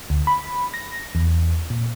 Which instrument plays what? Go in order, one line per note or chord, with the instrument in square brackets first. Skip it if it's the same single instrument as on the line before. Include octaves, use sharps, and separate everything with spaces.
[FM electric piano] D2
B5
A#6
E2
A#2